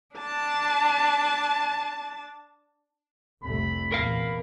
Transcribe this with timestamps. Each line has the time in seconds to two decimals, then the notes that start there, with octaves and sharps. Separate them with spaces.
0.16 D4 A5
3.44 F1 C2 A3 B5
3.92 E2 A#2 A#4 F5